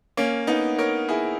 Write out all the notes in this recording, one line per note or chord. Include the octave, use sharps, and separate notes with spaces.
A#3 C#4
B3 D#4
A#4 C#5
E4 G#4